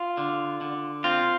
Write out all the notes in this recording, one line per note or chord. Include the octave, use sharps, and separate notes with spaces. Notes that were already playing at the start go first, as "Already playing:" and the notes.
Already playing: F4
D3
D3
C4 F4